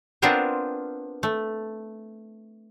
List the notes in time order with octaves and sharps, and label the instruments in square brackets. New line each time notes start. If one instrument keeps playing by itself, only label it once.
[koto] B3 C4 D4 F4 A#4 C5
A3